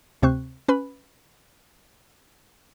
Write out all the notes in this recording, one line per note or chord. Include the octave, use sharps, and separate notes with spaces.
D2 C3 C4 C5 C#6 F#6
C#4 B4 B5